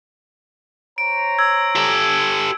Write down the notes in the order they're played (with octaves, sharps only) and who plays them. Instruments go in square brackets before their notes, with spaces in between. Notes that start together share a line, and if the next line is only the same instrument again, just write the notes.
[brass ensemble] C5 C#5 A#5 [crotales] D7
[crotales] E6 G#6
[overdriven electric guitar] G4 A4